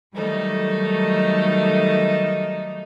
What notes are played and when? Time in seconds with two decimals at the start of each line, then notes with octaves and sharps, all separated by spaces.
0.15 D#3 F#3 G3 A3 D#4 A4